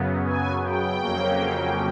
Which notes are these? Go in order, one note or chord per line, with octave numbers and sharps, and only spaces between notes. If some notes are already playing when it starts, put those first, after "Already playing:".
Already playing: F#2 C#3 F#3 B3
G#5
G5
F2 C#3 F#3 A#3 C#4